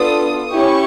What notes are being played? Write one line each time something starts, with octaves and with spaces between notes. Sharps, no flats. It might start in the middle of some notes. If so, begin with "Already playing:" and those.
Already playing: B3 D4 F4 A4 D#6
C#4 E4 G4 C#6